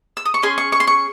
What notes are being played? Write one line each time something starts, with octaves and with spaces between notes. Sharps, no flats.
E6
D#6
C#6
C#4 G#4 C6
C#6
C#6
C6
C#6